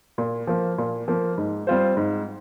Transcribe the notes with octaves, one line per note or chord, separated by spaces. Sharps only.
A#2
F3 A#3
A#2
F3 A#3
G#2
G3 C4 F4 C5
G#2